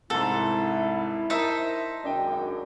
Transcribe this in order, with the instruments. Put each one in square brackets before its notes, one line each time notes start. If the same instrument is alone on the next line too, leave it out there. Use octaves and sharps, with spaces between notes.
[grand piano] C2 G#2 [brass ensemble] E4 [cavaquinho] A4
[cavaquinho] D#4 C5 E5 [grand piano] A#4 A5
[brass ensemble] G#1 F#2 [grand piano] D4 D#5 G5